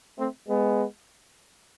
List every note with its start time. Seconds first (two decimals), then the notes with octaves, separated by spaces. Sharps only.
0.19 A3 C4
0.48 G#3 B3